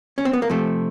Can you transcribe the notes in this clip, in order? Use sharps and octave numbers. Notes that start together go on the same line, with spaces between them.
C#4
C4
B3
A#3
C3 F3 A3